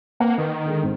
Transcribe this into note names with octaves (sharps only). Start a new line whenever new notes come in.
A#3 C4 B4 F#5
D#3 B4
D3 G#3
G#2 C4